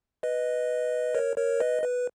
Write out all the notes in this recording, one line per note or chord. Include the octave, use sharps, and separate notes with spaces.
B4 D#5
A#4 C#5
A#4 C#5
B4 D#5
B4